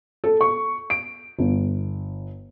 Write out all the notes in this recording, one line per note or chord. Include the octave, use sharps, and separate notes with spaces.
A4
C#6
D7
G1